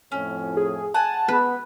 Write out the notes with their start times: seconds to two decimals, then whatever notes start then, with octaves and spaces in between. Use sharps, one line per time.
0.12 F2 A2 C#4
0.57 G#4
0.94 F#5 G#5 A5
1.28 B3 B4